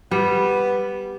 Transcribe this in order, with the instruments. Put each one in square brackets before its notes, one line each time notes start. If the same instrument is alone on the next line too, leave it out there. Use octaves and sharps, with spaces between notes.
[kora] G3 [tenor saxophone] B3